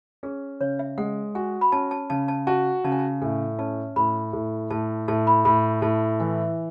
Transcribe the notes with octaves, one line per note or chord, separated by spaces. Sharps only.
C#4 G#4
C#3 C#5
E5
G#3 F#5
F#4 G#5
B5
C#4 A5
A5
C#3 A5
A5
F#4 A5
C#3 A5
G#5
A5
A2 G#5
C#4 A5
A2 B5
A2
A2 A5
A2 A5
B5
A2 B5
A2 A5
E3 G#5